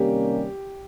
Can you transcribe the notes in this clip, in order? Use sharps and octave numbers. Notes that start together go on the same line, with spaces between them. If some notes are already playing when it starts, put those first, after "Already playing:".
Already playing: C3 D#3 G3 A#3 C#4 G4